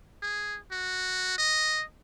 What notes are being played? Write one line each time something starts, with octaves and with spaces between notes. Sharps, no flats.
G#4
F#4
D#5